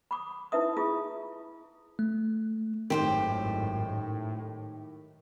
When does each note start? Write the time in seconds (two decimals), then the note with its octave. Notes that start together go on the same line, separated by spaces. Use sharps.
0.11 B5 D6 D#6
0.52 D#4 E4 B4 E5 D#6
0.77 E4 F4 G#4 D#6
1.99 A3
2.90 G#1 F#2 A2 D#3 G4 C5 G5